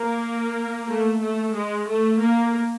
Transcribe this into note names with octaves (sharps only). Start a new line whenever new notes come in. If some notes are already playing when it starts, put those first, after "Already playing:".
Already playing: A#3
A3
A3
G#3
A3
A#3